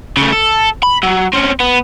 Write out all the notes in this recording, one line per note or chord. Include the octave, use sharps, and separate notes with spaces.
C#3 A3
A4
B5
F#3
C4 C#4
B3